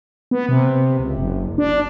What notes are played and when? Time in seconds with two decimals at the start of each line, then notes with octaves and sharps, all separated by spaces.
0.31 B3
0.49 C3
0.99 C#2
1.17 F#1
1.58 D4